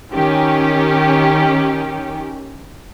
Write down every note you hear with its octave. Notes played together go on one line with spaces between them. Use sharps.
D#3 C#4 G4